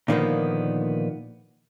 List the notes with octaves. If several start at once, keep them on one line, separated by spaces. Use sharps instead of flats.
A#2 D3 D#3 F3 A#3 B3